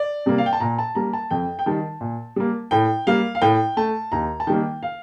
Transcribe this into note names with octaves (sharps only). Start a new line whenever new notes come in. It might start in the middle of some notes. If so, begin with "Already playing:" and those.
Already playing: D5
C3 G3 A#3
F5
G5
A5
A#2 A#5
A5
G3 A#3 A#5
A5
F2 G5
G5
D#3 G3 A5
A#2
G3 A#3
A2 G5
G3 A#3 F5
F5
A2 G5
A3 A5
D#2 A#5
A5
D#3 G3 A#3 G5
F5